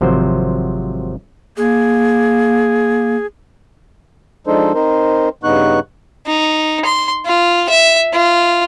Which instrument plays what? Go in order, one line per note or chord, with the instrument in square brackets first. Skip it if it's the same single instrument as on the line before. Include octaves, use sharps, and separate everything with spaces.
[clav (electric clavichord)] G#1 C3 F3 F#3 C5
[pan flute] A#3 [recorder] G#4
[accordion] F3 G#3 D4 D#4 A4 C5
C4 D#4 A#4 C5
G2 C#3 B3 D#4 C#6 F#6
[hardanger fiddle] D#4
C6
F4
E5
F4